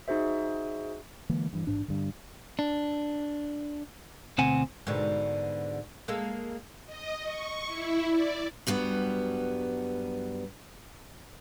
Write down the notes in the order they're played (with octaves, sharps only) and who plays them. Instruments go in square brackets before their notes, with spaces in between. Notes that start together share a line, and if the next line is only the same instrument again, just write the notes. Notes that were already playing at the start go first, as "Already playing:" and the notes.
[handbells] D#4 F#4 G#4 C5 E5
[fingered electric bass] D3 E3 G#3 A#3
G2 E3
A1 G#2 D4
G2 D3
[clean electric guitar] D4
D2 B2 C4 F#5 G#5
[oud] G#2 B2 D3
G#3 A#3 A4
[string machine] D#5
C#6
E4
D5
[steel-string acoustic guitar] G2 F#3 G3 B3